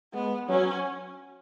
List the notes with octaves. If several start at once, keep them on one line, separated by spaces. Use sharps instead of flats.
G#3 B3
F#3 C#4